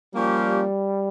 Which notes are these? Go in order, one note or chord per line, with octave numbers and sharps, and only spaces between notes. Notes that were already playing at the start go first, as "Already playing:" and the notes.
F3 G3 A#3 C#4 G4